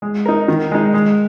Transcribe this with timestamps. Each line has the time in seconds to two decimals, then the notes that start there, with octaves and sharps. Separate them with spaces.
0.02 G#3
0.26 D#4 A#4
0.48 D#3
0.71 G#3 D#4
0.94 G#3